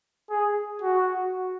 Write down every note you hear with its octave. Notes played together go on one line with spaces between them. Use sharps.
G#4
F#4